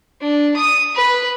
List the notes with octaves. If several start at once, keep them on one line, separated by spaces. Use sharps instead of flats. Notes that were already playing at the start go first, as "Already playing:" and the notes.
D4
D#6
B4